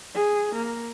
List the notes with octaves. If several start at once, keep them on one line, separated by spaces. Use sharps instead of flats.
G#4
A#3